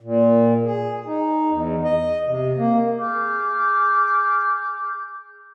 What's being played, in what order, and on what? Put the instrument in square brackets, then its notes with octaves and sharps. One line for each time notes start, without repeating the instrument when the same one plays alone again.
[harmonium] A#2
G#4
D#4
E2
D#5
C3
A#3
[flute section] G#4 D6 F6 G6